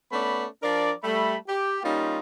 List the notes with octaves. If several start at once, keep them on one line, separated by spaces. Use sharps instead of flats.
A3 B3 C#4 D5 B5
F3 D4 A#4 D5
G3 A3 B5
G4
G3 A#3 C#4 D#4 F4